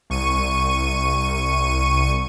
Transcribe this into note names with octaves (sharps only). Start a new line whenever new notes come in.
C2 C#6 D#7